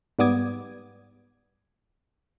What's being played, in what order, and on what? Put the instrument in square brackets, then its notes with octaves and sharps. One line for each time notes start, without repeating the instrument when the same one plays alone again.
[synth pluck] G#2 G3 B3 D6 D#6 G#6